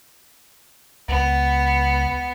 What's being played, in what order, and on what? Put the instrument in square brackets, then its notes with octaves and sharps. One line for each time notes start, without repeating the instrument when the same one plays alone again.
[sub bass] C#2 [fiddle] B3